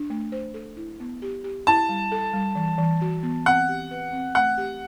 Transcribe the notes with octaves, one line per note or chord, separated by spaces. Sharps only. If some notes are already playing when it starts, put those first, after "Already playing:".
Already playing: D4
A3
C5
A4
E4
B3
G4
G4
E4 A5
G3
A4
G3
E3
E3
F#4
B3
C4 F#5
G4
B4
C4
A3 F#5
G4